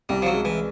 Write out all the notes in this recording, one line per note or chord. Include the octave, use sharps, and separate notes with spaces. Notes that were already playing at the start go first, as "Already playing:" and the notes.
C2 G3
F3
F#3
G#3
E3